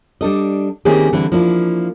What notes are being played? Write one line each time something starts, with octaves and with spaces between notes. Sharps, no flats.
G3 D4 A4 D#5
D#3 A#3 C4 C#4 G4 G#4
D3 E3 G3 C4 E4
F3 A#3 D4 E4